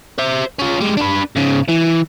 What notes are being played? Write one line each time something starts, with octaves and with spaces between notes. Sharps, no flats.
C5 E5
C#4 F4
G3 G#3
D4 B4
G#2 C#3
E3